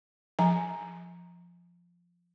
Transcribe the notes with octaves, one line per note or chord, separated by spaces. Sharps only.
F3 G#5 A#5